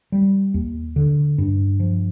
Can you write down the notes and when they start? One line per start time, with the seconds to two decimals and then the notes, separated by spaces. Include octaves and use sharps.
0.12 G3
0.54 D#2
0.96 D3
1.38 G2
1.80 F3